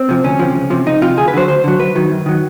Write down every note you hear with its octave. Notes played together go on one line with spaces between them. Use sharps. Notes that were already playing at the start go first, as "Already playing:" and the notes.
Already playing: C4
C3 F3
D2 C#4
C3 F3
C#2
C3 F3
C#2 D#4
C3 F3 F4
D2 G#4
B4
D3 F#3 C5
D2 C5
D3 F#3
F#2 B4
D#3 F#3
F#2
D#3 F#3